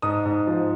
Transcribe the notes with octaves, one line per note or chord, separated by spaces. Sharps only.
G#2 D#6
G#2
F3